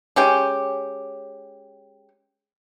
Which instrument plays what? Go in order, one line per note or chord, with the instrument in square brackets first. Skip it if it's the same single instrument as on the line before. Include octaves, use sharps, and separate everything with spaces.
[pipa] G#3 C#4 G4